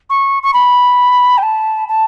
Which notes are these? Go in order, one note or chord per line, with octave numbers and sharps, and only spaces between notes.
C#6
C#6
B5
G5
A5
A5